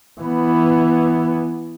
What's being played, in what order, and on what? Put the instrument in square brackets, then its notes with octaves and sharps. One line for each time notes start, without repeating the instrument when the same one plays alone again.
[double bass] E3 B3